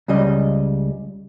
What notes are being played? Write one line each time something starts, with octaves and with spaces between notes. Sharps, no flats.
C#2 C#3 G3 D#5